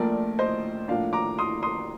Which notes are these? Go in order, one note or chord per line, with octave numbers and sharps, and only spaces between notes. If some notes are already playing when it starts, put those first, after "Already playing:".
Already playing: A#1 A#2 F3 A3 A#4 D5
C5 D#5
A2 F3 A#3 D4 D5 F5
A#5 D6
C6 D#6
C6 D#6